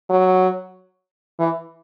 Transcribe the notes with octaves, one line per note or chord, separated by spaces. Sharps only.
F#3
E3